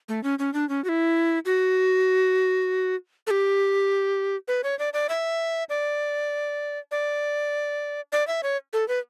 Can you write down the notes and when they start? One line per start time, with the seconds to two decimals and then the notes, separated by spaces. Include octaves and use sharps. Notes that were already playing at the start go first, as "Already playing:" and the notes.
0.09 A3
0.23 C#4
0.39 C#4
0.54 D4
0.69 C#4
0.84 F#4
0.89 E4
1.45 F#4
3.27 A4
3.31 G4
4.48 B4
4.64 C#5
4.79 D5
4.94 D5
5.09 E5
5.69 D5
6.91 D5
8.12 D5
8.27 E5
8.43 C#5
8.73 A4
8.88 B4